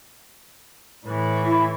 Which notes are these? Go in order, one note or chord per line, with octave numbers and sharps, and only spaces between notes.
A2 E3
E4